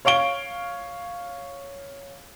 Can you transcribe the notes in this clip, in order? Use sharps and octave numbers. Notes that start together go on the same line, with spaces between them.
C#5 F5 C#6 D7 G7